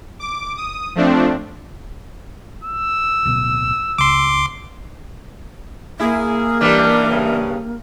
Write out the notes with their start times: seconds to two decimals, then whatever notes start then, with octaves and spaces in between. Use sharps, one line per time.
0.20 D6
0.57 D#6
0.95 F3 A3 C4 D4
2.64 E6
3.25 D1 B2
3.98 C#2 C6 D6
6.00 A#3 E4 G#4
6.61 G2 D#3 E3 G3 D4
7.10 G2 C#3